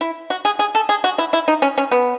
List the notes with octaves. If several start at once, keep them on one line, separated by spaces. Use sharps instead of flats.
E4
F#4
G#4
G#4
A4
G#4
F#4
E4
E4
D#4
C#4
C#4
B3